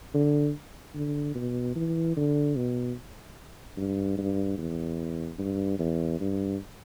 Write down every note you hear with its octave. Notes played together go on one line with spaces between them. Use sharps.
D3
D3
B2
E3
D3
B2
G2
G2
E2
G2
E2
G2